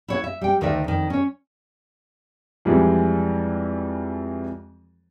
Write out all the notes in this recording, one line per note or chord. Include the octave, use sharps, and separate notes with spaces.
E4 C#5 F#5
E5
G3 G5
D2 D#3 D#4 A#4 D5 E5
F2 D#3
C#4 C#5
F2 E3 G3 G#3